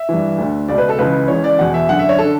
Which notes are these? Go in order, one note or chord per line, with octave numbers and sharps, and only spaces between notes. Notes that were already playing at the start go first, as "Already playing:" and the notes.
Already playing: E5
G2 E3
D2 D3
C#2 B2 D5
B4
A4
C#2 C#3 E3 B4
C#2 C#3 E3 C#5
D5
E2 B2 F#5
E5
F#2 D3 F#5
E5
C#5
D3 A4